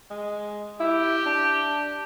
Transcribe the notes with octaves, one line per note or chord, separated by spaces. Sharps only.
G#3
E4 G4
D4